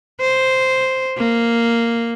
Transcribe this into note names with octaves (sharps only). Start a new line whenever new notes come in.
C5
A#3